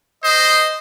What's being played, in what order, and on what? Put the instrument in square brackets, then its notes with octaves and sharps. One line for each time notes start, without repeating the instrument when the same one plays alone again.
[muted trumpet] C5 [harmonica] D#5